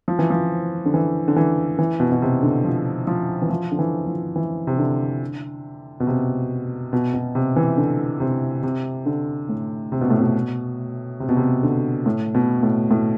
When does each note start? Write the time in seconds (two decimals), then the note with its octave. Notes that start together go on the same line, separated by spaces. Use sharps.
0.08 F3
0.19 E3
0.30 F3
0.86 D3
0.94 E3
1.28 D3
1.36 E3
1.79 E3
2.00 B2
2.12 B2
2.22 C3
2.43 D3
2.64 F3
3.07 F3
3.42 E3
3.50 F3
3.72 D3
3.79 E3
4.07 F3
4.36 E3
4.67 C3
4.79 D3
6.00 B2
6.07 C3
6.93 B2
7.14 B2
7.35 C3
7.56 E3
7.77 D3
8.20 C3
8.63 C3
9.06 D3
9.49 A2
9.92 C3
10.01 B2
10.10 A2
10.20 B2
11.20 C3
11.29 B2
11.37 C3
11.63 D3
12.06 A2
12.35 B2
12.63 A2
12.91 A2